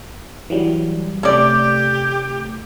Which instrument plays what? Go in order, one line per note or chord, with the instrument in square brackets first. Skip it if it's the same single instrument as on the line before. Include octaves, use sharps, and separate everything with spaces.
[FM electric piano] E3 F#3 G3
[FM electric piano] C3 A3 [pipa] C#4 D5 [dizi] G4